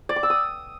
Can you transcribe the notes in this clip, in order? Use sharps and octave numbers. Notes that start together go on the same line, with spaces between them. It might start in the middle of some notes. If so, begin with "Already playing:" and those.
D5
D6
E6
D#6